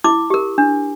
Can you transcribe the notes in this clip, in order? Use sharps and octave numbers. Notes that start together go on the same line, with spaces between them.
E4 D6
G4 A#4
D4